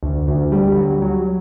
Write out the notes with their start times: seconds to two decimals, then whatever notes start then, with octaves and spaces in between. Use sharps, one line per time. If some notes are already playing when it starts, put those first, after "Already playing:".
0.03 D2
0.27 D2
0.52 G3
0.77 F#3
1.02 F#3